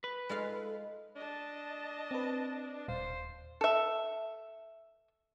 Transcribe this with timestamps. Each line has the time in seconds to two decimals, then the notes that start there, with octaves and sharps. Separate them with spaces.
0.04 B4
0.29 G#3 F4 A4 F5
1.16 D4 D#5 A5
2.11 C4 B4
2.88 D#1 C5 F5
3.61 A4 E5